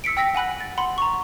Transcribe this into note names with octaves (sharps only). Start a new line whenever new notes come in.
E6 B6 C#7 D7
G5 E6 A#6 B6
F#5 G#5 B5 F#6
A6
F#5 B5 C6
A#5 C#6